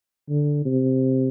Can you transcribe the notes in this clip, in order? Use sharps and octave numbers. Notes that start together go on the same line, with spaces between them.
D3
C3